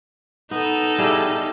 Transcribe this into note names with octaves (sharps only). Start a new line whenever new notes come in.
B3 D#4 A4
G3 E4 G#4